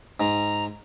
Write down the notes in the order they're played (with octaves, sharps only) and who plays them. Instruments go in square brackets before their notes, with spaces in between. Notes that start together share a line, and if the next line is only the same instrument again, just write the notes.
[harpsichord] G#2 [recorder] A#5